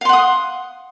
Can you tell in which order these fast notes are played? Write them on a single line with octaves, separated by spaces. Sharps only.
F5 C6 F#5 D#6